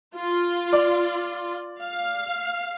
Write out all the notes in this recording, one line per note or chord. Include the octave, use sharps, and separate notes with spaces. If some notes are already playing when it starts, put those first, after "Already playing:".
F4
D5
F5